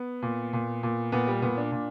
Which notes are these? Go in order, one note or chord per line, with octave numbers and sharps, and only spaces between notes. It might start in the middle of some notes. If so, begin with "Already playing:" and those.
Already playing: B3
A#2
A#2
A#2
A#2 B3
G3
A#2 B3
D4
A#2